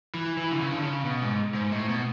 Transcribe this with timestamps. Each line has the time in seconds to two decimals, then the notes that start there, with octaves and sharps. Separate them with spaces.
0.14 E3
0.37 E3
0.52 D3
0.59 C#3
0.72 D3
0.82 C#3
1.05 B2
1.22 G#2
1.55 G#2
1.71 A2
1.89 B2